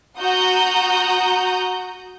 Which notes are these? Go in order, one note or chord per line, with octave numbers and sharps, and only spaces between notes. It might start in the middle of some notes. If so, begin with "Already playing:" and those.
F#4 F#5 A#5 D#6 G6